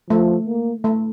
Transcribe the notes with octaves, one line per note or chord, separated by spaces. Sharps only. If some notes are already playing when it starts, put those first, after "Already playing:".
F3 A3
A#3
A3